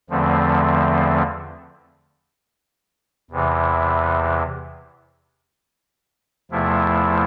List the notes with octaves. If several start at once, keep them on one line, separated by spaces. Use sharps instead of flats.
E2 D3 F3 A3 C4
E2 C3 E3
E2 C3 F3 A3 E4